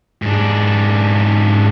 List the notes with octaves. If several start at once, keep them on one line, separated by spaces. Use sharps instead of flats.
G#2 D4